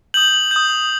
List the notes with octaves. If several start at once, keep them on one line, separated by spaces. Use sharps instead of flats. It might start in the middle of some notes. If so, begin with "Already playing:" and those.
D#6 G6 F#7
D#6 G6